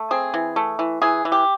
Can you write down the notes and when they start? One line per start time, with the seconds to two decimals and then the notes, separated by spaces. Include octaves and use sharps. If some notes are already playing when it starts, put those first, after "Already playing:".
Already playing: A3
0.11 C4 G#4
0.34 E3
0.56 A3
0.79 E3
1.02 E3 G#4
1.25 E3
1.32 G4